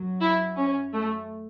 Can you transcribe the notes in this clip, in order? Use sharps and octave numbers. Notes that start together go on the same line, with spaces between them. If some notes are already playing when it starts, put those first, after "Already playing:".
Already playing: F#2 F#3
E4
C#4
A3